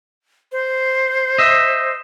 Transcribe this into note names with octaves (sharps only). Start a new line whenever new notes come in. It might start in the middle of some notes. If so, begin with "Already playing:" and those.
C5
D#5 E5